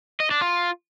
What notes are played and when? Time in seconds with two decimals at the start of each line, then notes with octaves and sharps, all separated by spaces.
0.20 D#5
0.31 D4
0.42 F4